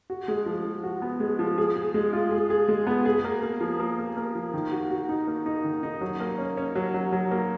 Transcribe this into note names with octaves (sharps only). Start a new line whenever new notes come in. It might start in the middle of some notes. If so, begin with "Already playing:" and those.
F#4
G#3
F3
F3
F#4
B3
G#3
F3
G#4
G#4
G#3
F4
G#4
G#4
G#3
B3
G#4
A#3
A#3
F3
A#3
A#3
A#3
F3
D#3
F#4
F#4
D#4
A#3
D#4
D#3
D#4
F#3
A#3
C#4
C#4
F#3
F#3
F#3
A#3